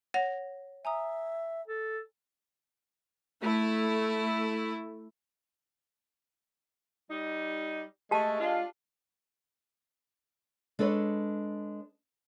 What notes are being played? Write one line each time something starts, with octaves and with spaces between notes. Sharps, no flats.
C#5 F#5 A#6 F7
E5 G#5 A#5 D#6
A4
A3 E4
G3 D#4
G#3 A3 G4 A5
D4 F4
G#3 D4 A4 B4 C#5